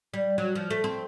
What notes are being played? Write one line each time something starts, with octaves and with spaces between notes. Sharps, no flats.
G3
F#3
F3
A3
C4